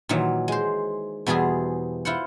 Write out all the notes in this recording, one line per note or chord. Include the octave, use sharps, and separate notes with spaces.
A#2 D#3 E3 F#3
G#3 C5
E2 B2 E3 G3 G#4 C5
E4 F4 C5 F#5